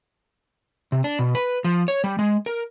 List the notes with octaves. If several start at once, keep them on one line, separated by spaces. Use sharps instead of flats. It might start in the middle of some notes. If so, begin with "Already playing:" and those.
C3
D4
B2
B4
F3
C#5
G3
G#3
A#4